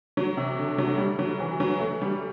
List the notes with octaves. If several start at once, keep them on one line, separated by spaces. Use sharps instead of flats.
F#3
C3
D3
F#3
G3
F#3
E3
F#3
A3
G3